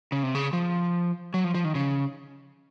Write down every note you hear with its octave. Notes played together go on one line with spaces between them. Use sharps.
C#3
C3
C#3
F3
F#3
F3
F3
D#3
C#3